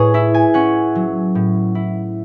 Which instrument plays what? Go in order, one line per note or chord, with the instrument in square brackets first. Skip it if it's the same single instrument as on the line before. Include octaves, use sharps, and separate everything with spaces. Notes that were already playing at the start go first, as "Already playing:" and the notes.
Already playing: [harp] A2 G#4 B4 C#5
E4 E5
G#5
C#4 F#5
F#3
A2
E4